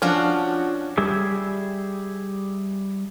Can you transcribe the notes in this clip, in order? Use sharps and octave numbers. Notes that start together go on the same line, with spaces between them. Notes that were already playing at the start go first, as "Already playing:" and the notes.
F3 C#4 D4 F#4
G3 G4 G#4 E5